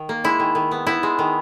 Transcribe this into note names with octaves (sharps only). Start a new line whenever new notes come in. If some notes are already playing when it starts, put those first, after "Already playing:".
Already playing: D#3
A#3
G#3 E4
D#3
D#3
B3
B3 E4
G#3
D#3